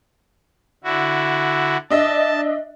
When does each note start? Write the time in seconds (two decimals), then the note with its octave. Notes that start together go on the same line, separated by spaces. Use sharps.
0.84 D3 E4 F#4
1.90 D4 D#5 E5 A5